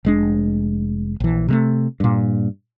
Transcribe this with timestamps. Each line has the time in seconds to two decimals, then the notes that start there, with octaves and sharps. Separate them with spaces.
0.05 F1 G#3 D4
1.20 A#1 E3
1.48 C3 G#3 A3
2.00 G2 A#2